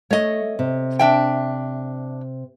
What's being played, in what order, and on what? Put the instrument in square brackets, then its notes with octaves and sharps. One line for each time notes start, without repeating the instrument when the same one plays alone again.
[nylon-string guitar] A3 [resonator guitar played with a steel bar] C#5 D#5
[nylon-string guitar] C3
[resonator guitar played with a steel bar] D4 E5 G5